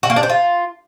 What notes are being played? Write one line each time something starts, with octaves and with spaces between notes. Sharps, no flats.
F#4
A#3
D4
C5
F4